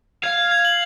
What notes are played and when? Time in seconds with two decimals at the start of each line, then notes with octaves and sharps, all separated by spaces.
0.23 F5 G#6
0.37 G#6
0.51 G#6
0.65 F#7